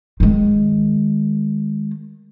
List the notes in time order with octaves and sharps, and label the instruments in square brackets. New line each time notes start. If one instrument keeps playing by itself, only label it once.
[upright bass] D#3 G#3